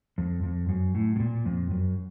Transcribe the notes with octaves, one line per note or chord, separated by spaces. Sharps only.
F2
F2
F#2
A2
A2
A#2
F2
F#2